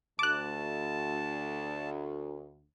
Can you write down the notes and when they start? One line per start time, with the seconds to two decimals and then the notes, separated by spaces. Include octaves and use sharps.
0.19 D2 A5 D6 F#6